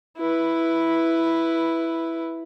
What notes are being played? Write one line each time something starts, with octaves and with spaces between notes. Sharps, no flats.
E4 B4